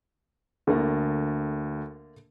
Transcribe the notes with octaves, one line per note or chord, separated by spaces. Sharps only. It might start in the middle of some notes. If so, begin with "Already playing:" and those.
D2 D3 A3 A#3